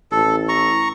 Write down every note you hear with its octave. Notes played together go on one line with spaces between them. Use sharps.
A1 A4
A#5 C#6